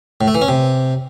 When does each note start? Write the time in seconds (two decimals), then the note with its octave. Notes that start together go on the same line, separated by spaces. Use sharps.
0.21 A2
0.28 A3
0.35 E3
0.42 C#4
0.49 C3